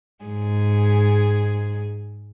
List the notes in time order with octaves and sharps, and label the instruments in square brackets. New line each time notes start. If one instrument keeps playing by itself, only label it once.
[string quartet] G#2 G#4